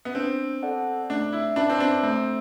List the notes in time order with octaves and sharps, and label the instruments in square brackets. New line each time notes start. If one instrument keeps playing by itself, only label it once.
[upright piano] B3
[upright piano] C4 [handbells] D4
[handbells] A4 D5 F#5 A5
[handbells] A3 [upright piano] D4
[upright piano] E4
[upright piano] D4 [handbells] E4 B4 E5 A5
[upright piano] C4
D4
[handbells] A3 [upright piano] C4